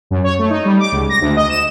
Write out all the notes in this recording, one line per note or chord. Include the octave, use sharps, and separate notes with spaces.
F#2
C#5
A3
D#4
G3
D6
C#2
A#6
D2
D#5
E7